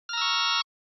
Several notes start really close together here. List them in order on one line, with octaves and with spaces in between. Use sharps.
F6 A#5 E6 C#6